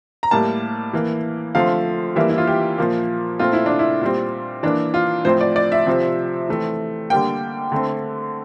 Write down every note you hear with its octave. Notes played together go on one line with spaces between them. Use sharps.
A#5
A2 G3 A#3 A5
E3 A#3
D3 F3 A3 C4 F5
E3 G3 A#3 E5
E4
F4
G4
A#2 F3 A#3
A#2 A3 C4 F4
E4
D4
E4
A#2 G3 C4
E3 A#3 D4
F4
A2 F3 C4 C5
D5
D5
E5
C3 F3 C4
E3 A3 C4
D3 G3 A#3 G5
D3 A3 C4